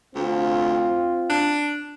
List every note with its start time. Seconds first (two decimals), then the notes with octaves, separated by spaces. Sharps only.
0.15 D2 C4 F4
1.30 D4